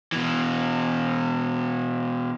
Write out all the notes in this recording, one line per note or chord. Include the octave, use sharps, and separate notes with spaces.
B2 E3